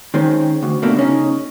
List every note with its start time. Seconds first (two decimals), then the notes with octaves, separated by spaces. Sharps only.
0.14 D#3 G#3 C4 C#4
0.63 D2
0.82 B2 G3 A3 A#3 D4
0.97 C#3 C#4 D#4